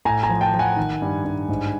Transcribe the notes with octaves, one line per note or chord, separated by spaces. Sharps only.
A2 G#5 A#5
G#5 A#5
F3
G5 A5
F3
F#5 G#5
D#3
G2
G2
G#2